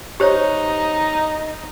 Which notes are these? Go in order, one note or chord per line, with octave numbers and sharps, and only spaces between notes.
D#4 G4 C5 C#5